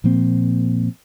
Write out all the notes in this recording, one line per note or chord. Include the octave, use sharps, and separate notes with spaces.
A#2 F3 A#3 C4